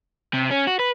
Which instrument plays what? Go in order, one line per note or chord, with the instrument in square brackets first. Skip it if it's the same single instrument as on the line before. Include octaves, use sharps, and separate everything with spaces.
[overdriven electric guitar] C3
C#4
F#4
B4